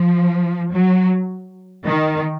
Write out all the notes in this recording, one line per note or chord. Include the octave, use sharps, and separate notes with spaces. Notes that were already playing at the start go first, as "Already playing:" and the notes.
Already playing: F3
F#3
D#3